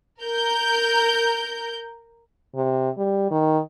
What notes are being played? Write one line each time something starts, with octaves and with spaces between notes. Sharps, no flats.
A#4 G6
C3
G3
D#3